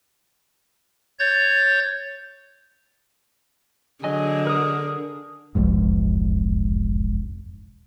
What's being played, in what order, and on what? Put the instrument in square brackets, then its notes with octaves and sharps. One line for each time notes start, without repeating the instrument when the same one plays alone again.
[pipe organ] C#5 G6 A6
[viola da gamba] D3 G#4 [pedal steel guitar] F#3 D#5 G#5
[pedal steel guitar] A#4 D#6
[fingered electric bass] E1 B1 F2 G#2